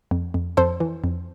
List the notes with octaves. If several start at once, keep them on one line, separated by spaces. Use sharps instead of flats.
F2
F2
F2 A4 C5
E3
F2